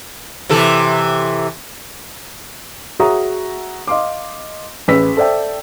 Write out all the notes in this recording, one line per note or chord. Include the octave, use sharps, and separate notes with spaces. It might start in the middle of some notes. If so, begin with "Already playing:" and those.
C3 E3 A4
F#4 G#4 C#5 E5 A#5 D#6
D#5 F5 C6 D6
A1 G#4 B4 E6 B6
A4 C5 D5 E5 G5